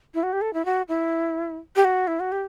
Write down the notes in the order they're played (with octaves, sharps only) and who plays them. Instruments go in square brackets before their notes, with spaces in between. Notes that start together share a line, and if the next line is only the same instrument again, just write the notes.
[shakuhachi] E4
F#4
G4
A4
E4
F#4
E4
G4
F#4
E4
F#4
G4